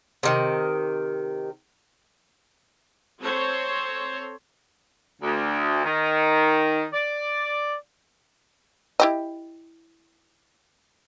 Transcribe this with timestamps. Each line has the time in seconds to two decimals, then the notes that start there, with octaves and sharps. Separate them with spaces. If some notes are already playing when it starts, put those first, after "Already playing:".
0.23 C3 D#3
3.21 C4 A4 C5 C#5
5.22 D2
5.85 D#3
6.92 D5
9.00 E4 G4 D#5